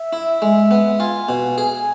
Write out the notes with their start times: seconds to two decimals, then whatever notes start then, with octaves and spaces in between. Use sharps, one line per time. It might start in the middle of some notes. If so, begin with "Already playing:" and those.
Already playing: E5
0.13 E4
0.42 G#3
0.71 B3
1.00 F4 G#5
1.29 B2
1.58 G#4